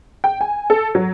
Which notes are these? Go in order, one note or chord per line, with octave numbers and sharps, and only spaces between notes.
G5
G#5
A4
F#3